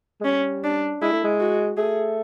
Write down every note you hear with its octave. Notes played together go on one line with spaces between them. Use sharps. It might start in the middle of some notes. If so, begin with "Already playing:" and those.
G#3
G3 C#4
D4
G#3 E4
A3
G#3
F#4
A3 G#4